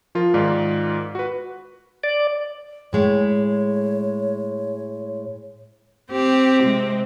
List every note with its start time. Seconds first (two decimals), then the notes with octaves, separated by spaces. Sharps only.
0.15 F3 F4 A#4
0.34 G#2 D#3 F4 D5
1.15 F#4 B4
2.03 D5
2.93 A2 G#3 A3 C#5
6.12 C4 G4
6.60 C3 G#3